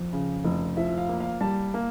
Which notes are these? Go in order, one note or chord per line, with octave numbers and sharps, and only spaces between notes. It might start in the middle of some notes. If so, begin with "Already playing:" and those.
Already playing: F2
C#3
F1
F3 E5
F5
A#3
F5
G3 A5
A#3